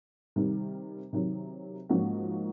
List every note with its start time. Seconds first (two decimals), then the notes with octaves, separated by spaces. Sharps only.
0.36 C3 D#3 G3
1.13 C3 D#3 F#3
1.89 G#2 F3 A#3 C#4 F#4